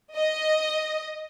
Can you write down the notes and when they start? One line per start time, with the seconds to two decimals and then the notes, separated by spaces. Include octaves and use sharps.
0.14 D#5